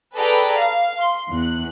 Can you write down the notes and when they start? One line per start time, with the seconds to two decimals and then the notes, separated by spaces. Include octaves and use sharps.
0.16 G#4 A4 B4 D5 G5 A#5
0.59 F5
1.00 C6
1.30 E2 F#6